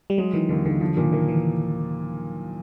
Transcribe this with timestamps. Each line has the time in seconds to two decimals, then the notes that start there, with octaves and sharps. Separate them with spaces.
0.10 G3
0.18 F#3 G#3
0.33 D#3 E3
0.49 D#2 D3
0.65 D#2 D3
0.81 D3 F3
0.97 A#2 D#3
1.12 D#3 A#3
1.28 E3